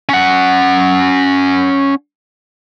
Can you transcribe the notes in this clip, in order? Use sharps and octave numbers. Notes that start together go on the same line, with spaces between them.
C#4 F#5